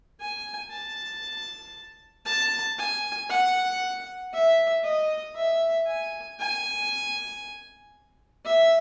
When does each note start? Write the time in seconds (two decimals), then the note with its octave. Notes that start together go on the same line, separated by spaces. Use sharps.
0.20 G#5
0.71 A5
2.26 A5
2.78 G#5
3.30 F#5
4.33 E5
4.84 D#5
5.36 E5
5.87 G#5
6.39 G#5
8.45 E5